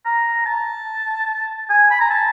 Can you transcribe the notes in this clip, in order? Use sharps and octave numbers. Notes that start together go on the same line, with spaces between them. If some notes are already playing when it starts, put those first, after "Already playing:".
A#5
A5
G#5
B5
A#5
A5